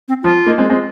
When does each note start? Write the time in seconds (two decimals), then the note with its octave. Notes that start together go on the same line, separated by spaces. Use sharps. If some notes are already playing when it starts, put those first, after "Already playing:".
0.08 C4
0.23 F3 F4
0.46 A#3 D#4
0.58 G#3 C4
0.70 G#3 C4